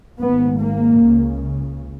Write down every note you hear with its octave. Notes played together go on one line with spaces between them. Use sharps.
G#1 G#2 B3
A#3
C#2 C#3